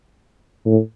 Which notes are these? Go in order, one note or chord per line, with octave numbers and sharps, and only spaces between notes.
A2